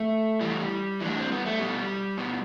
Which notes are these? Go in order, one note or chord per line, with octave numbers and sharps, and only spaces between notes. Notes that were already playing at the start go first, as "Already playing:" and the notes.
Already playing: A3
A2 E3 G3
A2 E3 D4
C4
B3
A3
B2 G3
B2